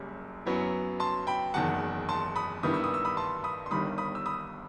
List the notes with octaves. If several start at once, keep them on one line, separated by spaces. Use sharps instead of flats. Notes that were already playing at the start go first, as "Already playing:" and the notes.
Already playing: F#1 F#2 G3
F#2 F#3 B3 E4
A5 C6
G5 B5
F#1 E2 D#3 F#5 A5
A5 C6
B5 D#6
G2 D#3 G3 B3 E4 D#6
E6
D#6
E6
B5 D#6
A5 C6
B5 D#6
C6
G1 G2 D#3 G3 B5 D#6
B5 D#6
E6
B5 D#6